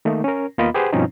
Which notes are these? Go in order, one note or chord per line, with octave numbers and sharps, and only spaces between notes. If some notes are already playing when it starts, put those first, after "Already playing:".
D#3 A3 A#3 D#4
C#4 A#4
D#2 A#3 B3 F4 D#5 B5
G4 G#4 B4 C5 F#5
G2 B2 F3 C4 C#4 D#4